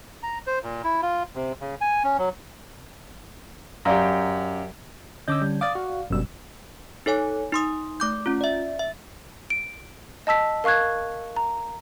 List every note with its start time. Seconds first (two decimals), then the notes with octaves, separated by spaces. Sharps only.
0.23 A#5
0.47 C5
0.63 A#2
0.84 E4
1.02 F4
1.35 C3
1.61 C#3
1.81 G#5
2.04 C#4
2.18 F#3
3.85 F#2 G4 D5 F5 A#5
5.28 D3 C#4 D#5 D6 E6 G6
5.41 G3
5.61 D5 F5 D6 D#6 A6
5.75 F#4
6.10 G1 F#2 B2 G3 E6
7.06 D#4 A4 C#5 G#5
7.52 D#4 C6 D#6
8.00 A3 D6 G6
8.26 C#4 F4
8.41 D5 E5
8.79 E5
9.50 D7
10.27 D#5 A5 E6 B6
10.64 A#4 F5 C#6 F#6 G#6
11.36 A#5